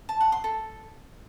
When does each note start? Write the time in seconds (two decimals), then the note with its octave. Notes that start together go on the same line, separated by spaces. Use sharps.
0.09 A5
0.21 F#5
0.32 C6
0.44 A4